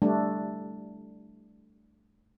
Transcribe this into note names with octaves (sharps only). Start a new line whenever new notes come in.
G3 A3 D4